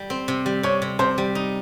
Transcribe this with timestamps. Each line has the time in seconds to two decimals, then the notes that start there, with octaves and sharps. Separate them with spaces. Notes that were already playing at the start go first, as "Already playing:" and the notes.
Already playing: G3
0.10 C4
0.28 C3
0.46 G3
0.63 C3 C#5
0.82 C3
0.99 C3 C5
1.18 G3
1.35 D#4